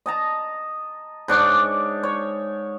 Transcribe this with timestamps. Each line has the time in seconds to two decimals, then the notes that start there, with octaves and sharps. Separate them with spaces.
0.06 D#5 A5 A#5
1.28 G#2 D4 C#5 D6
2.03 C#5